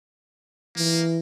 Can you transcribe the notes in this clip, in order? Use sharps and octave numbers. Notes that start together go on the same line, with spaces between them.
E3 A#3